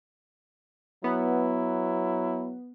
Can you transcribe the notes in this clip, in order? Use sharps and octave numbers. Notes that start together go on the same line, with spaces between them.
F#3 B3 E4